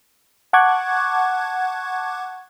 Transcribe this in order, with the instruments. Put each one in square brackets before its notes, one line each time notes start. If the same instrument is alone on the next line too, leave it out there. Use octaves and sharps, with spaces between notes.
[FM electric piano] F#5 A5 C#6 D6 F#6 G#6